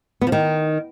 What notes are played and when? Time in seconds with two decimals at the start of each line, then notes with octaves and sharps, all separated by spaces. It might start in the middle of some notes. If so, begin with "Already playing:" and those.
0.21 B3
0.27 F3
0.32 D#3